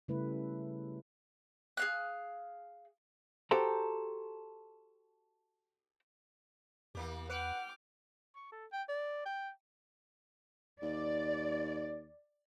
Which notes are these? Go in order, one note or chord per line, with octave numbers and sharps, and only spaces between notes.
C#3 G3 A3 E4 B4
G#4 F5 F#6
F#4 G4 A4 C5 G5 A#5
E2 E3 A#3 G4
B4 F#5 G5 D6 F6
C#6
A4
G5
D5
G5
D#2 D5